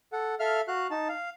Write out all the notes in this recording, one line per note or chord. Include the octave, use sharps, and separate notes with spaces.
A4 F#5
A4 E5 F5 F6
F#4 F5 F#6
D#4 A5
F5